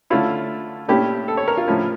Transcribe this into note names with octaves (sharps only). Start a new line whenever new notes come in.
D3 A3 C#4 E4 F4
A#2 A3 C#4 E4 G4
A4
C#5
A#4
F4
A2 F3 C#4 E4